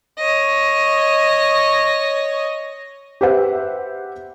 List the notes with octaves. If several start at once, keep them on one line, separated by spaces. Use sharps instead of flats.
C#5 D#5
G4 B4 C5 E5 F#5